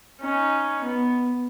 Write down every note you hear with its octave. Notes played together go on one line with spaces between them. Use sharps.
C#4 D#4
B3